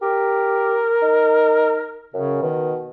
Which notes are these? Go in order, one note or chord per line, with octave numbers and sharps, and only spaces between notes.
G4 A#4
D#4
F#2 C#3
B2 D#3